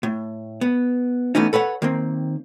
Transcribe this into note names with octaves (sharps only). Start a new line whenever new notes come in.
A2
B3
E3 A3 B3 C#4 D#4
A4 B4 C#5 F#5
D#3 A#3 C4